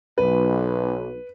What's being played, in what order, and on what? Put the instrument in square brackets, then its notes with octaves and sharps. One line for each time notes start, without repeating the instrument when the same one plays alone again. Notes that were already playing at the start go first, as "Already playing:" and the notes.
[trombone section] B1 [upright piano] B4